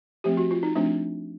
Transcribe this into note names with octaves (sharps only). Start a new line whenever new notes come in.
F3 A3 C4 G4
F#4
F4
D#4
F3 A3 C4 D4